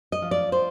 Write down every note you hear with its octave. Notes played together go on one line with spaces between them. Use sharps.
D#5
F3
D5
C5